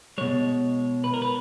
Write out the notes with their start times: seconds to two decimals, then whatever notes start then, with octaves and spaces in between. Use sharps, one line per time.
0.18 B2 G#3 C#5
1.04 B4
1.14 A#4
1.22 B4